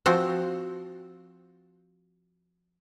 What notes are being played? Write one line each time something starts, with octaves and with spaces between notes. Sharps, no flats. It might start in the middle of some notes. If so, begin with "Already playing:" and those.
F3 C4 F#4